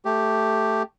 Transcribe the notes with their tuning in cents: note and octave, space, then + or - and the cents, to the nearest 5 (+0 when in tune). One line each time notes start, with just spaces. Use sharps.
A3 +0 G4 +0